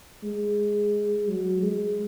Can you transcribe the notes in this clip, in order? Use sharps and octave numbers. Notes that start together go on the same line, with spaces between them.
G#3
F#3
G#3